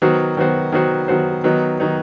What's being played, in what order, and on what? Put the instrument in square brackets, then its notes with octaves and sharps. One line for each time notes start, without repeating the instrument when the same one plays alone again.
[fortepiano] D#3 F#3 B3 F#4 C5
D#3 F#3 B3 F#4 C5
D#3 F#3 B3 F#4 C5
D#3 F#3 B3 F#4 C5
D#3 F#3 B3 D#4
D#3 F#3 B3 D#4